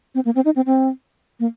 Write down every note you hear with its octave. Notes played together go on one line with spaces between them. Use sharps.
C4
A#3
C4
D#4
C4
C4
A#3